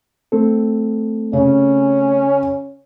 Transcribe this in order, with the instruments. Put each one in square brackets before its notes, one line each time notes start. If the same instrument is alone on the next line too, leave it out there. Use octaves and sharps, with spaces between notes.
[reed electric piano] A3 C4 A4
[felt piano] C#3 [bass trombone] C#4